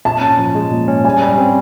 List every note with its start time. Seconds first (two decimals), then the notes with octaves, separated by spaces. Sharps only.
0.05 A#2 A5
0.21 C#4
0.38 F3
0.55 G#3
0.72 A#2
0.88 C#4
1.05 G3 G#5
1.22 G3
1.38 C4